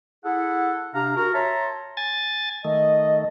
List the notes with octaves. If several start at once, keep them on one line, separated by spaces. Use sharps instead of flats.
E4 G#4 A4 F#5
C3 D4 F5 A#5
F#4 A#4
C#5 E5 A5 A#5 C6
G#5 A6
D#3 A3 D#5